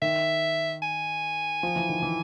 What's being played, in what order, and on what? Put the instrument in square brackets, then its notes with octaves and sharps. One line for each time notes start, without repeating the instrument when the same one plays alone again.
[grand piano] D#3 [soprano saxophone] E5
[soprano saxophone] G#5
[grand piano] F3
E3
D#3
E3